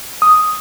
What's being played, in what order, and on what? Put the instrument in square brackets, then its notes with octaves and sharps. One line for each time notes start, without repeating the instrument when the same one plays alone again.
[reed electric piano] D#6